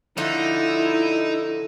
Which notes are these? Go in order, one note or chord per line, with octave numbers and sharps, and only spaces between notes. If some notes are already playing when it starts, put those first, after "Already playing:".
D3 F3 D#4 E4